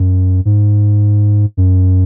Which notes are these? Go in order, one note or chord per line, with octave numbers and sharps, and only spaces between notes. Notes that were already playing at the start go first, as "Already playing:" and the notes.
Already playing: F#2
G#2
F#2